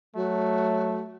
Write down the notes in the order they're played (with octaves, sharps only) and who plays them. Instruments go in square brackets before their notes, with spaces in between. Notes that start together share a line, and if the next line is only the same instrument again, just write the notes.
[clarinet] F#3 [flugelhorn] A3 [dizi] F#4